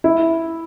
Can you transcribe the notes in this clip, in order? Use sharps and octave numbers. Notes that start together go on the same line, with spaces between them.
E4